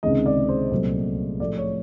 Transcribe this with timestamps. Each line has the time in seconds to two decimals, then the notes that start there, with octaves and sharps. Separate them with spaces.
0.03 C#2 C3 D#3 G#3 D#5
0.26 D5
0.49 C5
0.71 C2 A#2 F#3 A3
1.40 A2 F3 A3 D5
1.58 C#5